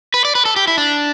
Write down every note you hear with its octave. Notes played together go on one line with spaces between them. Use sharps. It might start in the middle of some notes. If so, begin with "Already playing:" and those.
B4
D5
B4
A4
G4
E4
D4